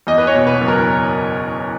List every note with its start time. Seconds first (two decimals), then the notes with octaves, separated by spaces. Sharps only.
0.07 E2 D#5
0.18 B4
0.27 C#5
0.35 B2
0.47 B4
0.61 F#1
0.68 A#4